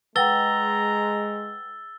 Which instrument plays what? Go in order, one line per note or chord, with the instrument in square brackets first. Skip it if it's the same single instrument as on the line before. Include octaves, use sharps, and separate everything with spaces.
[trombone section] G#3 [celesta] B4 F#5 G5 [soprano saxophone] A#5 [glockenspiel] E6 A6 G7